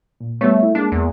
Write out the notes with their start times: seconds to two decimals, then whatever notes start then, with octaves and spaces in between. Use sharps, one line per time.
0.20 A#2
0.41 G3 A3 B3 C#5
0.63 E4
0.75 G#3 A#3 D4
0.92 E2